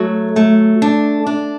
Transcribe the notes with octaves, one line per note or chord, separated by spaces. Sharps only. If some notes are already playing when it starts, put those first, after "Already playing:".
Already playing: F#3 A3
A3
D4
D4